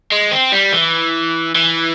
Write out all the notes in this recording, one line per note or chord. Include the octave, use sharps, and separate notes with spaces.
G#3
C4
G3
E3
E3